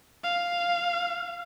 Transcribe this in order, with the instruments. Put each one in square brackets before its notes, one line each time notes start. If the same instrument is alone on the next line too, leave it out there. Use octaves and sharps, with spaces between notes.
[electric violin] F5